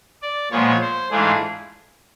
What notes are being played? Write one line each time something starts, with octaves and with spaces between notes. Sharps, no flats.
D5
A#2 F3 G#3 B3 C#5
C5
G#2 E3 A3 D4 F4 G#4